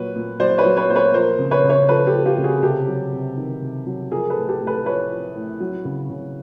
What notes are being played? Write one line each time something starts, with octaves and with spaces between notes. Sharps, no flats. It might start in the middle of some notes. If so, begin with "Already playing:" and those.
Already playing: A#2 F#3 B4 C#5
A#2
F#3 C5 D5
B4 C#5
F#3
B4 C#5
A#2 C5
B4 C#5
F3 A#4 C5
C#3
B4 C#5
C#3
B4 C#5
F3 A4 B4
G4 A4
F3
F4 G4
C#3
F#4 G#4
C3 G4 A4
F#3
C3
D#3
C3
F#3
F3 G#4 A#4
A4 B4
A2
G4 A4
A2
A4 B4
F3 B4 C#5
F3
A2
F#3
C#3
C#3